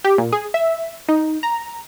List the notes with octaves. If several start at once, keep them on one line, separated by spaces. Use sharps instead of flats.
G4
A#2
G#4
E5
D#4
A#5